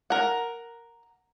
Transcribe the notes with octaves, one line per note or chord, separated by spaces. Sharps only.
A#4 F#5